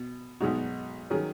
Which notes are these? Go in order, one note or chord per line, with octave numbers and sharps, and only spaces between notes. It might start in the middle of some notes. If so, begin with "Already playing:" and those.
Already playing: B2
B1 B2 G#3 D#4 F#4
D#3 F#3 C#4 G#4